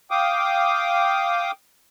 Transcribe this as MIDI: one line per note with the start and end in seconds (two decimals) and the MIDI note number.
0.11 1.51 77
0.11 1.51 79
0.11 1.51 86
0.11 1.51 87